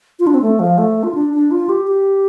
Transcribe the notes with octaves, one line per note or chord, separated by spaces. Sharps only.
F4
D4
C4
A3
F3
A3
F4
D4
D4
F4
G4
G4